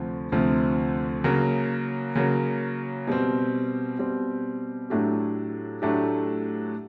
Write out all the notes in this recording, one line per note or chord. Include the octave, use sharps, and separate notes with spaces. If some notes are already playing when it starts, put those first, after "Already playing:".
Already playing: D2 C3 F3
D2 C3 F3
C#3 F#3 A#3
C#3 F#3 A#3
B2 G3 C4
B2 G3 C4
A2 F#3 A3 D4 G4
A2 F#3 A3 D4 G4